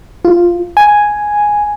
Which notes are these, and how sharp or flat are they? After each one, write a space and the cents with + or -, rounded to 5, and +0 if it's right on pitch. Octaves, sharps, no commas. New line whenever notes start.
F4 -5
G#5 +0